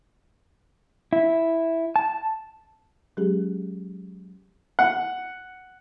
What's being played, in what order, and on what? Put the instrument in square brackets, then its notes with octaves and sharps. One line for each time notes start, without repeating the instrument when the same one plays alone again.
[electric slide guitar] E4
A5
[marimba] F#3 G#3 C#4 G4 G#4
[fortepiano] F#5